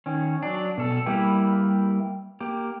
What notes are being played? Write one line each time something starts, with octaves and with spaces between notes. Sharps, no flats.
D#3 C#4
F#3 D4
B2 A4
G3 A#3 E4 G4 B4
A#3 G4